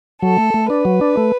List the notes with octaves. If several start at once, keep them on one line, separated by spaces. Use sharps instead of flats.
F#3 A4
A3
A3
D4 B4
F#3
D4
A3